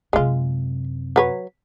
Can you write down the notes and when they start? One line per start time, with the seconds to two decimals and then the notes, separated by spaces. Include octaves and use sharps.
0.13 F#2 C3 G#3 F4
1.16 F#3 B4 C#5